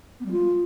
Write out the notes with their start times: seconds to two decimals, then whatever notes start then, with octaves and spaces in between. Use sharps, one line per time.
0.20 B3
0.25 G3
0.31 F4